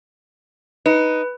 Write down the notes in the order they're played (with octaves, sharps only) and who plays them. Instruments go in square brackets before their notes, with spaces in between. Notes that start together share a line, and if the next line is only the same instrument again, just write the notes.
[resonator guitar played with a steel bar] D#4 [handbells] B4